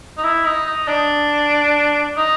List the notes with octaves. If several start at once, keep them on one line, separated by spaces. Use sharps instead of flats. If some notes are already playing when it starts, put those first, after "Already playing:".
D#4
E4
D#4
D#4
D4
D#4